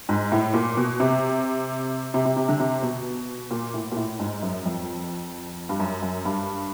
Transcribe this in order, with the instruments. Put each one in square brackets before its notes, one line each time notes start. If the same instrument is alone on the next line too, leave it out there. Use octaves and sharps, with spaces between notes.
[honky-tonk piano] G#2
A2
A#2
B2
C3
C3
C3
C3
D3
C3
B2
A#2
A2
A#2
A2
G#2
F#2
F2
G2
F#2
F#2
G2